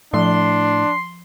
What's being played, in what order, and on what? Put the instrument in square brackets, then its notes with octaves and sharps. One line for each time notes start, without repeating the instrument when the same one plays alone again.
[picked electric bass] A2 [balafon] F3 [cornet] D4 [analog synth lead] C6